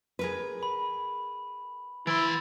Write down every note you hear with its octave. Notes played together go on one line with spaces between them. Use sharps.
G#4 A#4 B4
B5
E3 E4 B5 C6 A6 D7